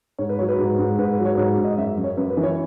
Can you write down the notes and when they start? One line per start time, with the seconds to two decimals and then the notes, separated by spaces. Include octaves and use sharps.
0.19 G#2 C#5
0.29 B4
0.39 F#3 C#5
0.49 B4
0.59 G#2
0.79 G#2
0.99 G#2 B4
1.12 B4
1.18 F#3
1.25 C#5
1.37 G#2 C#5
1.58 G#2
1.64 D#5
1.78 F#2 E5
1.98 F#2
2.04 C#5
2.17 F#2 B4
2.30 B4
2.37 E3
2.43 C#5